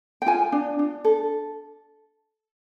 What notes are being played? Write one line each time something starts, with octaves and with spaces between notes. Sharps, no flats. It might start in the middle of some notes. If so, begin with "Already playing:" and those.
G5
F4 G#5
D4
D4
A4